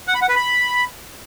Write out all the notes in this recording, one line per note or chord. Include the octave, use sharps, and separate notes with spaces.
F#5
B5
F#5
B4
B5